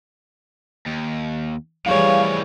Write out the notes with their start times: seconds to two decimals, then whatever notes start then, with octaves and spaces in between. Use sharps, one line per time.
0.86 D#2
1.86 A2 E3 F3 G3 G#4 C#5 F5